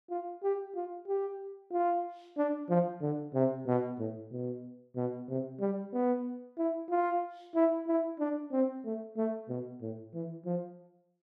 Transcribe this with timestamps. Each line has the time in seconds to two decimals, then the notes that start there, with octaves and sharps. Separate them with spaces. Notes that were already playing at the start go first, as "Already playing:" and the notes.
0.10 F4
0.43 G4
0.75 F4
1.07 G4
1.72 F4
2.37 D4
2.69 F3
3.02 D3
3.34 C3
3.66 B2
3.99 A2
4.32 B2
4.96 B2
5.28 C3
5.60 G3
5.93 B3
6.58 E4
6.90 F4
7.55 E4
7.87 E4
8.20 D4
8.52 C4
8.85 A3
9.17 A3
9.49 B2
9.82 A2
10.14 E3
10.46 F3